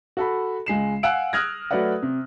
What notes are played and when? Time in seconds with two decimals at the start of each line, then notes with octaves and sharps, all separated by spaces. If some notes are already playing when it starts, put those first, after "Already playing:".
0.17 F#4 A4 B5
0.66 C#2 G#3 C7 E7
1.03 F5 F#5 G#5 E6 F#6 D7
1.33 D#6 F6 F#6 G#6 A#6
1.71 F#3 A3 B4 D5 F#5
2.03 C3